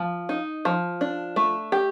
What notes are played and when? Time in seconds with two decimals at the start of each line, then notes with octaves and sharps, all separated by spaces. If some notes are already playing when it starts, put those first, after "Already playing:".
Already playing: F3
0.29 D#4
0.65 F3
1.01 D4
1.36 A3
1.72 G4